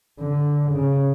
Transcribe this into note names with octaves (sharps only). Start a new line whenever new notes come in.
D3
C#3